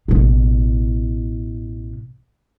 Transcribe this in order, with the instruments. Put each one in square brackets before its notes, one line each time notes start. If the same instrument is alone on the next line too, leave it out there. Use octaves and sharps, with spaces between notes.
[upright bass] A1 B2